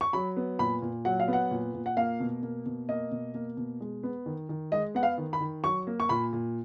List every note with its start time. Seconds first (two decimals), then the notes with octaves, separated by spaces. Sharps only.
0.01 C#6
0.13 F#3 B5
0.37 B3
0.59 A#2 B5
0.82 A#2
1.05 F#3 F#5
1.20 F5
1.28 B3
1.33 F#5
1.51 A#2
1.74 A#2
1.86 F#5
1.97 A#3 F5
2.20 B2
2.43 A#3
2.66 B2
2.89 A#3 D#5
3.11 B2
3.34 A#3
3.57 B2
3.80 G#3
4.03 B3
4.26 D#3
4.49 D#3
4.72 G#3 D#5
4.95 B3 F#5
5.03 F5
5.18 D#3
5.33 B5
5.41 D#3
5.64 F#3 C#6
5.87 A#3
6.00 C#6
6.09 A#2 B5
6.33 A#2